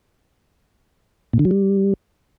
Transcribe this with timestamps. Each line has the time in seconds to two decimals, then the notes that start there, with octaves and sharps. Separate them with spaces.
1.33 A#2
1.39 D3
1.45 F#3
1.51 G3